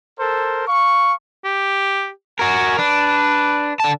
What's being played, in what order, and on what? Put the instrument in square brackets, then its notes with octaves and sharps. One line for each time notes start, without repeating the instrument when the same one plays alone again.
[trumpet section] A4 A#4 C5
F5 C#6
[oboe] G4
[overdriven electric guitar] F#4 A#4 [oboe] G#5
[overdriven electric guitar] D4 [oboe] B4
[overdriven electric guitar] D3 A5